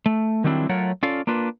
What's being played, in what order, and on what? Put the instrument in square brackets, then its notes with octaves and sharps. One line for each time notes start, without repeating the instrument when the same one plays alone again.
[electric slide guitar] A3
D#3 F#3 G3 C4 D4 E4
F#3 A3 F4 A#4 C#5 F#5
C#4 F4 A4 D5 F5
A#3 D4 F4 B4